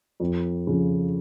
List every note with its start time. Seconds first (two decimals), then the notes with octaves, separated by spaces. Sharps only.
0.20 F2
0.67 C#3 F3